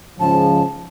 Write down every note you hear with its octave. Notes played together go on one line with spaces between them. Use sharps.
G#2 C#3 F3 A5